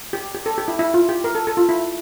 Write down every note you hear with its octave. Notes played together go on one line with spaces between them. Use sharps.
G4
G4
A4
G4
E4
E4
F4
G4
A#4
A4
A4
F4
E4